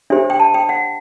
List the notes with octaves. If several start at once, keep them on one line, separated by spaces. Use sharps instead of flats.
D4 G4 C5 E5
G5
A5
G5
F#5